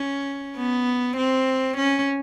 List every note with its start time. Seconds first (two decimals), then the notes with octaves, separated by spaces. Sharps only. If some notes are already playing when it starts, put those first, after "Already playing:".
Already playing: C#4
0.57 B3
1.17 C4
1.77 C#4